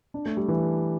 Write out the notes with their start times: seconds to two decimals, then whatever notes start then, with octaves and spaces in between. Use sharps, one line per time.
0.14 D4
0.26 A3
0.37 G3
0.48 E3